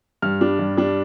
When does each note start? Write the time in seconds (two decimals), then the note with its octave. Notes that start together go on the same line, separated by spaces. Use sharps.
0.22 G2 F6
0.41 G3 D4
0.59 G2
0.78 G3 D4